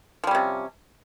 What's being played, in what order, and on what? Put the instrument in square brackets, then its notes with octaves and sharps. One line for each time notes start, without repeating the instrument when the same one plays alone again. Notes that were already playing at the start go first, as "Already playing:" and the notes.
[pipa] F3
G3
C#4
C3